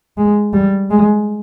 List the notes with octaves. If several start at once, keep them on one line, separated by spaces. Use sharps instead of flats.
G#3
G3
G#3